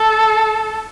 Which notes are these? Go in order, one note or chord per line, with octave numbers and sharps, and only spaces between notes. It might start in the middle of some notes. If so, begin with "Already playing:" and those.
Already playing: A4